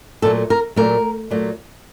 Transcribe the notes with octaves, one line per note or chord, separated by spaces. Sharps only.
A#2 F#3 A3 A4
A#4
A#2 F#3 A3 A#4
A#2 F#3 A3